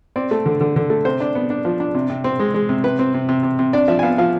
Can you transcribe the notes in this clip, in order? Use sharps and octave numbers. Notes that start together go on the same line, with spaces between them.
C4 D5
A3
D3
D3
D3
A3
C3 C5
D4
B3
D4
F3
D4
C3
C3
C4
G#3
G#3
C3
C3 B4
C4
C3
C3
C3
C3
D4 D5
F3 E5
G#5
B3 F5
F3 F5